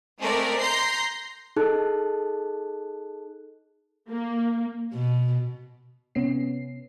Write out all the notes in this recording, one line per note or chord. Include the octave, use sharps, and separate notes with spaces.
G#3 A3 C4 A#4 D5
A#5 C6 G6 A#6 C7
D#4 G#4 A4 A5 F#6
A#3
B2
C3 B3 C#4 C7